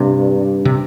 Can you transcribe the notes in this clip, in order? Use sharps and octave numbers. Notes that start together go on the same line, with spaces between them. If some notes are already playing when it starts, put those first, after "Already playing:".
Already playing: G2 C3
C3